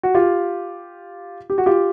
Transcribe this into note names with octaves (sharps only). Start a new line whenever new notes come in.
F#4
F4 G4
G4
F#4
F4 G4